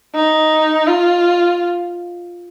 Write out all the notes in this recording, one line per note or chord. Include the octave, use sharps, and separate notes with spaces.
D#4
F4